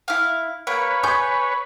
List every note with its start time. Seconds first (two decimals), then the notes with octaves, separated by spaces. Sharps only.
0.08 E4 F5
0.67 A#3 B4 C#5
1.03 G#5 C#6 G6